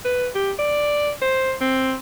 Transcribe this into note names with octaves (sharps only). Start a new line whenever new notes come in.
B4
G4
D5
C5
C4